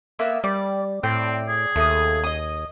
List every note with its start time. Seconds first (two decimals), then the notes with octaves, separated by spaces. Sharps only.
0.19 A#3 B3 E5
0.44 G3 D5
1.03 A2 C4 D5 G5
1.48 G#4
1.76 D#2 A3 D#6
2.24 D#5 D#6